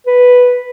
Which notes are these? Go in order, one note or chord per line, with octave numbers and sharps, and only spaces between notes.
B4